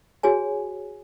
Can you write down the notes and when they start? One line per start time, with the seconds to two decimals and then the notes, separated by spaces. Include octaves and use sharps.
0.23 F#4 G#4 C#5 G#5